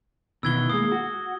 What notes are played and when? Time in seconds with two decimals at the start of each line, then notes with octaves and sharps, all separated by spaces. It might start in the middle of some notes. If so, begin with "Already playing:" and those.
0.43 B2 D#3 E3 E6 G#6 G7
0.70 G#3 A#3 D#6
0.92 F#4